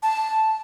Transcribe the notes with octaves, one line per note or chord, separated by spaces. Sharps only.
A5